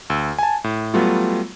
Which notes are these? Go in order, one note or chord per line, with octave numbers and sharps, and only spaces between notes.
D2 E6
G#5 A5
A2
F#3 G3 A3 B3 F4